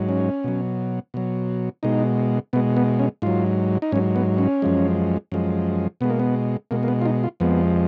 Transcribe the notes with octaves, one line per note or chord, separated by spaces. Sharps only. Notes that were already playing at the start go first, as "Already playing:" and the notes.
Already playing: G#2 F#3
C#4
B2 F#3
B2 F#3
B2 G#3 D#4
B2 G#3 B3
B3
C#4
G#2 F#3 F4
D#4
G#2 F#3 C#4
B3
C#4
F#2 F3 G#3
F#2 F3 G#3
B2 G#3 B3
A#3
B3
B2 G#3 A#3
A#3
B3
F4
D#4
F4
F2 F3 G#3 B3